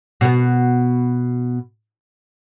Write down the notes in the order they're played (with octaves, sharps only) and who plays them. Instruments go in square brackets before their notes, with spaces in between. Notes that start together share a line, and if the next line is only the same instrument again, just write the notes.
[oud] B2 B3